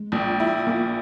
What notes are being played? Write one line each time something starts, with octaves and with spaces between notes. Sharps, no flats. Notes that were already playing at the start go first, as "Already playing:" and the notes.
Already playing: G#3
A#1
E4
A#2